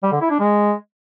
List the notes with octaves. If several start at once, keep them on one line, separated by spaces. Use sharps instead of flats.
G3
D3
E4
D4
G#3